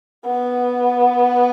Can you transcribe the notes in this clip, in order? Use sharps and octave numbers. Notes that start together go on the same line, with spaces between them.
B3